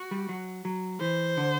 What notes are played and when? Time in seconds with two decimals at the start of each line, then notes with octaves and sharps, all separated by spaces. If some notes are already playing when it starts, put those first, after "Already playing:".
Already playing: F#4
0.11 G3
0.29 F#3
0.65 F#3
1.01 E3 C5
1.37 D3